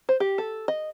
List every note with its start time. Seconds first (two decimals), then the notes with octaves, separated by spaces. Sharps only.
0.09 C5
0.20 G4
0.38 A4
0.68 D#5